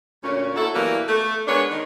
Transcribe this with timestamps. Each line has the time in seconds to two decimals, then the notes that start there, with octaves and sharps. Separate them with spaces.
0.24 D2 A#2 C#4
0.56 A#3 E4 F#4 A4
0.74 B2 E3 F#3 G3 A#3
1.09 A3
1.47 G#3 B3 D4 A#4 C#5
1.71 D#3